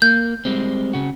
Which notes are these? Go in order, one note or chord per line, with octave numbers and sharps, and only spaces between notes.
A#3 G6
G3 G#3 C4
C#3 F#4